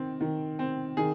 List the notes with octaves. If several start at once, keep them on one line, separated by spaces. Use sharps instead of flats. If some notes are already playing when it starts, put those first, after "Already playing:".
Already playing: D#3 C4
D#3
C4
D#3 G#4